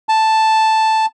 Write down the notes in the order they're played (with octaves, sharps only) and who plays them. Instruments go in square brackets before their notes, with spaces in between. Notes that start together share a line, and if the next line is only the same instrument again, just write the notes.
[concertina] A5